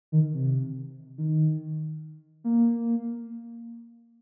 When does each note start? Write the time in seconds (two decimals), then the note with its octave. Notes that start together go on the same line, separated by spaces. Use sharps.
0.12 D#3
0.34 C3
1.18 D#3
2.44 A#3